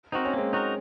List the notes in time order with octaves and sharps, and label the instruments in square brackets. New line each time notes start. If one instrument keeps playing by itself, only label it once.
[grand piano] C4 [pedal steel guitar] D#4 F#4 A#4
[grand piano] C#4
[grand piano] G#3 C4 [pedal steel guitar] A#3
[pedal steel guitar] D#4 F#4 A#4